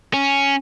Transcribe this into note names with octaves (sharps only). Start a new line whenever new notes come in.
C#4